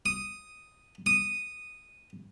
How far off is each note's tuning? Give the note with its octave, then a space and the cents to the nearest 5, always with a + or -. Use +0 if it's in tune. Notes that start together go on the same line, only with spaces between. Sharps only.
D#6 +0
D#6 -5